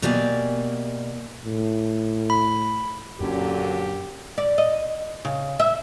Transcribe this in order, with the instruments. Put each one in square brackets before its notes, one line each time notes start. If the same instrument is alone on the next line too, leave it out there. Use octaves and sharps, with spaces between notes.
[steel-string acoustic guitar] B2 A#3 G4 D5 E5 G#5
[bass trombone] A2
[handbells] B5
[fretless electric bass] F#2 C4 C#4 [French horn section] A#2 D3 F#3 [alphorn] G4
[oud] D5
D#5
C#3
E5